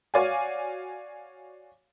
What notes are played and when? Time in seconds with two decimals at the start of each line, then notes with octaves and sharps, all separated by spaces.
0.14 F#4 C#5 D5 F5 G#5